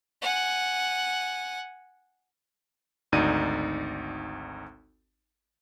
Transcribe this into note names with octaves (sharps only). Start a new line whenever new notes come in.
F#5 G#5
G#1 D2 D#4 D5 D#7